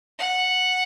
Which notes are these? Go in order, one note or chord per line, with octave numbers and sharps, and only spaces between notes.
F#5